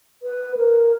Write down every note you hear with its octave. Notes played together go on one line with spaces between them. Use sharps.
B4
A#4